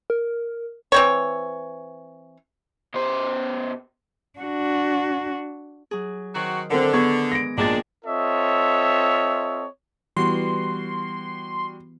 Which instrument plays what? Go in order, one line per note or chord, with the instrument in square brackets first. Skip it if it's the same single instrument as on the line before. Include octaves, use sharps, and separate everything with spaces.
[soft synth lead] A#4
[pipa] E3 C4 C#5
[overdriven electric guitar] B2 C5
[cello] D4 F#4
[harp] F#3 G#4
[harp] D#3 [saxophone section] F#3 C4 F#4
[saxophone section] D3 [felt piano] C4 A4 A#4
[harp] B3 G#4 B4 [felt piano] C#6 G#6
[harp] G#2 [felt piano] A#6 D7
[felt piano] A#1 A#3 A6 [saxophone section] F#2 G#3 D4 [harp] G5
[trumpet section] C4 F4 A4 C#5 D#5 E5
[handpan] E3 B3 [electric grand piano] G3 F#4 [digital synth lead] C6